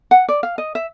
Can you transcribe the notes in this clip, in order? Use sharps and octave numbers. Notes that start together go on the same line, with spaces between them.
F#5
D5
F5
D#5
E5